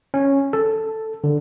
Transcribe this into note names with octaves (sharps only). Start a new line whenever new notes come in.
C#4
A4
D3